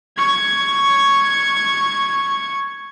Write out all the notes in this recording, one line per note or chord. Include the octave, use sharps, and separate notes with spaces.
C#6 G#6